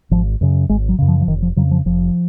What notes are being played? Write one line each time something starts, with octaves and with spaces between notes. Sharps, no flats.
G#1 F3
F#2 C#3
G#1 G#3
F#3
F#2 C#3
F3
F3
F1 D#3
F3
F2 C#3 F#3
F3
F1 F3